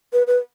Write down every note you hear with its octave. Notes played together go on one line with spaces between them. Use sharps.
B4
B4